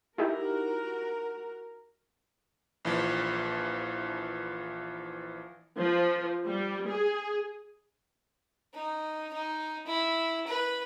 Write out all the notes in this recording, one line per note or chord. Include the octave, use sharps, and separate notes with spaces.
D#4 E4 F#4 G4 A#4
A#1 E3 F3
F3
G3
G#4
D#4
D#4
E4
B4